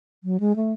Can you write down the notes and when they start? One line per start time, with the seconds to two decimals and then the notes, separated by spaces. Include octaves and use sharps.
0.24 F#3
0.40 G#3
0.56 A3